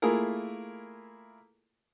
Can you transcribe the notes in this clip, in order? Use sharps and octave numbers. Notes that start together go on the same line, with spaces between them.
A3 A#3 E4 F4 G#4 A#4